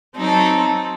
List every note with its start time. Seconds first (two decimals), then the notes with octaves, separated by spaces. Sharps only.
0.17 F#3 C4 D#4 A4